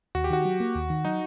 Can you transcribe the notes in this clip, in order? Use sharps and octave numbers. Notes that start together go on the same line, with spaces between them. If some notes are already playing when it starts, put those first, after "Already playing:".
D#2 F#4
G4
D#3 F#4
F#3
A#3
D#2
D#3
F#3 D#4